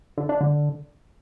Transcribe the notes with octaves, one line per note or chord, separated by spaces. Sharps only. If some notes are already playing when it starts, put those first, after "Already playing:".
D3
D4
D3